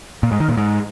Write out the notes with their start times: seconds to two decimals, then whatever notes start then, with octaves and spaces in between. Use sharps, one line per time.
0.23 A#2
0.32 G#2
0.40 D#3
0.49 A#2
0.57 G#2